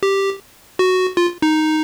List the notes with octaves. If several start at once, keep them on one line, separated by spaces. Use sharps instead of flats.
G4
F#4
F4
D#4